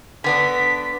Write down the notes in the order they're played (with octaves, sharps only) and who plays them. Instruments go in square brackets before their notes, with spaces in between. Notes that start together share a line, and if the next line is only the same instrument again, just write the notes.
[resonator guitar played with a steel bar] D3 B3 D4 [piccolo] B6